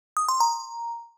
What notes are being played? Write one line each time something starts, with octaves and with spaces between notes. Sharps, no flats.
D#6
C6
A#5